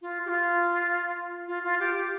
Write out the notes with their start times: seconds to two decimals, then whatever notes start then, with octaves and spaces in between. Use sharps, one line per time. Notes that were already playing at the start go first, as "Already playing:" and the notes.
0.01 F4
0.25 G4
0.29 F4
1.47 F4
1.63 F4
1.79 G4
1.96 G4